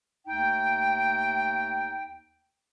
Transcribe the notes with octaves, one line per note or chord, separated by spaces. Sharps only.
D#2 A3 D#4 G5